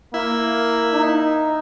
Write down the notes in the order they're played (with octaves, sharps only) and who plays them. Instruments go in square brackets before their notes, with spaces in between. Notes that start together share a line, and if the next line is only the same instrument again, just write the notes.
[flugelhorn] A#3 [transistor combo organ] E4
[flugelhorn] D#4